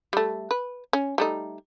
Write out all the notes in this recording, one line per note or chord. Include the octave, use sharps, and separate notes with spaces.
G3 A3
B4
C#4
G3 A3 D#4